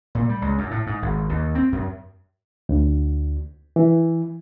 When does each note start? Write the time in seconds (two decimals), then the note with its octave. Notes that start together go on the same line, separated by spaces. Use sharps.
0.15 A#2
0.29 G3
0.42 C#2
0.58 F#2
0.71 A2
0.87 G#2
1.02 G#1
1.29 D#2
1.55 C4
1.72 F#2
2.69 D2
3.76 E3